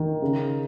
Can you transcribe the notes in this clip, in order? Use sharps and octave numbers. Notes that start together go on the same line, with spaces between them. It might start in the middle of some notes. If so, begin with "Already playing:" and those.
Already playing: D#3
C#3